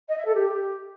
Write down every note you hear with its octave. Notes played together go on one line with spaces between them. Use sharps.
D#5
E5
A4
G4